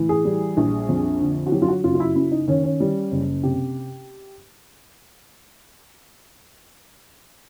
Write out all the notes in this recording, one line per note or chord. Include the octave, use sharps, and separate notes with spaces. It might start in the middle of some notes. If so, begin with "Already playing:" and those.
Already playing: A2 E3
G#4
G3
A#1
F2
D3
F#4
F#3 G4
F4
F#4
F#1 F4
F4
E4
F#2 E4
D#4
D#3 C#4
C#4
G3
F#1
C3 G4